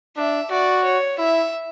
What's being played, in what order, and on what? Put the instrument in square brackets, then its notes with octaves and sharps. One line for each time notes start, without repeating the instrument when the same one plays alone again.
[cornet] D4 [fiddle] E5
[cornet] F#4 [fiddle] D5
[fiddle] C#5
[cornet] E4 [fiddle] E5